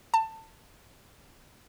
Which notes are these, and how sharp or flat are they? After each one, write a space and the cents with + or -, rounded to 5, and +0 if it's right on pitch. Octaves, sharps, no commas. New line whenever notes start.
A5 +20